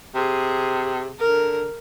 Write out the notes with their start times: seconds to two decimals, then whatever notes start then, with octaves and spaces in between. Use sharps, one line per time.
0.15 C3 G#4
1.19 D3 A#4